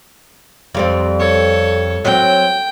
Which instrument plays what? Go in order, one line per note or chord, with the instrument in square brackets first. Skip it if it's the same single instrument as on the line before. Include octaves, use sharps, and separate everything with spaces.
[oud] F2 G3 C4
[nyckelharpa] A4 C#5
[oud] F#3 C4 [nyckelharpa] G5